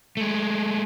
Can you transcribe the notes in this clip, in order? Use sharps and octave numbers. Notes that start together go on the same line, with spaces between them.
G#3 A3